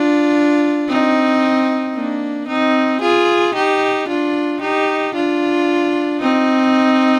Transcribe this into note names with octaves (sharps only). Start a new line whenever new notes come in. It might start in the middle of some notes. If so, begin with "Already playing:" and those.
Already playing: D4 F4
C4 D#4
A#3 D4
C4 D#4
F4 G#4
D#4 G4
D4 F4
D#4 G4
D4 F4
C4 D#4